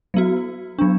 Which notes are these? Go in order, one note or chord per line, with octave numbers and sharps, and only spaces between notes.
F#3 B3 F#4
F#3 B3 D4